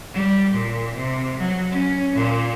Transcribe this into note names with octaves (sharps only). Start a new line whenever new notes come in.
G3
A#2
C3
F#3
C#4
A#2